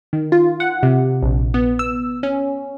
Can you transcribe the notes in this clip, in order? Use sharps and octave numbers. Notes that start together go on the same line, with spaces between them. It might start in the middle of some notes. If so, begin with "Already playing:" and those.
D#3
F4
F#5
C3
A#1
B3
E6
C#4